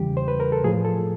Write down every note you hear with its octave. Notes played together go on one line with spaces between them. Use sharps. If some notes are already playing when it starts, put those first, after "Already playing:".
Already playing: E2 C#3 E3 G3 G4
C5
B4
A#4
A4
A2 F3 G#4
A4